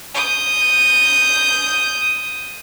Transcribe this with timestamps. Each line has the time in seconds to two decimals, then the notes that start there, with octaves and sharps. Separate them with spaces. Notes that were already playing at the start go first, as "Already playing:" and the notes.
0.14 D#6 G6